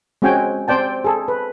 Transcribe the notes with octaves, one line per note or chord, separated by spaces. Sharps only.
G#3 C4 C#4 F#4 G5 G#5
C4 C5 D5 G5 A5
G#4 A4
B4